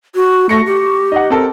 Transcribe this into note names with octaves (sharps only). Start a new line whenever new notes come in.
F#4
A3 C#6 A#6 C#7
G4
D#4 D#5 F#5
C4 A4 A#4